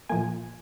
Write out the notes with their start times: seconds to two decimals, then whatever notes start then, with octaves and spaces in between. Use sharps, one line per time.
0.09 A#2 F3 A#3 G#5